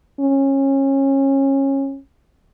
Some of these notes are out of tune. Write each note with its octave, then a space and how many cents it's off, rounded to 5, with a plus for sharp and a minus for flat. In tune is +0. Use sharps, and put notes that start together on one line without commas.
C#4 -25